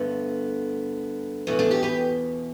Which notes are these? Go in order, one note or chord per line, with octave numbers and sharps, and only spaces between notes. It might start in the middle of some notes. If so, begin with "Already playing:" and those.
Already playing: G2 D3 A3 B3
E2 B2 A3 B3
A3 D4
D4 G4
G4 B4